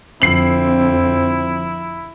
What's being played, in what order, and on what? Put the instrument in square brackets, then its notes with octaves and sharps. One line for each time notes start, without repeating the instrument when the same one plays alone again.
[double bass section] F2 D3 F3 [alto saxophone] C4 [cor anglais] E4 [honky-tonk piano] C7 F#7